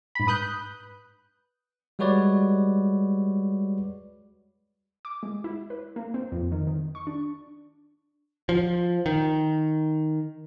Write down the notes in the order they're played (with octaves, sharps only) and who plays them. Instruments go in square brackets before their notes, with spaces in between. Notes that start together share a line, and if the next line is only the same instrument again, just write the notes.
[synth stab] G#2 B5
B4 D#6 F#6 G6
[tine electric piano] G3 G#3 F#4 B4 C#5 D5
[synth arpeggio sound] D6
G#3
E4
B4
A#3
C4
F2
D#3
D#3
C#6
D4
[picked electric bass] F3
D#3